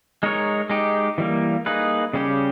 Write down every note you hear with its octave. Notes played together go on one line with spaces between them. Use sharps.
G#3 D#4 A#4 C#5
G#3 D#4 G4
E3 G3 A#3
A#3 D#4 G#4 B4
C#3 G3 C#4 G4